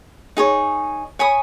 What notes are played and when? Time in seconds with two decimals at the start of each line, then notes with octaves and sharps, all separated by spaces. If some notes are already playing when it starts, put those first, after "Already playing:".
0.37 D#4 G#4 C#5
1.19 C#5 G#5 B5 D#6